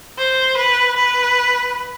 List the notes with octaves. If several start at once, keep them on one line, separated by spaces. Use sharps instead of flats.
C5
B4
B4